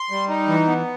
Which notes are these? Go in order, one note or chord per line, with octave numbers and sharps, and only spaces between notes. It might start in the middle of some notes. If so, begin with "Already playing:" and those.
Already playing: C6
G3
D#4
E3
B3